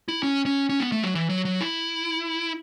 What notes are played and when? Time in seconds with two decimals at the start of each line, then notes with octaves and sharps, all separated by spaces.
0.08 E4
0.23 C#4
0.46 C#4
0.69 C#4
0.80 B3
0.92 A3
1.03 F#3
1.15 E3
1.30 F#3
1.45 F#3
1.61 E4